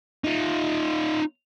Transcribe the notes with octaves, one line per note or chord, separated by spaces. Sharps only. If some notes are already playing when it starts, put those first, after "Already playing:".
D#4 F4